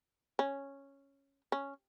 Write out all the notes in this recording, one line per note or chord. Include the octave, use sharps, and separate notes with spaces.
C#4
C#4